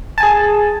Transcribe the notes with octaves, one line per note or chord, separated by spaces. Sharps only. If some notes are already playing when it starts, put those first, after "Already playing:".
G#4 G#5 A5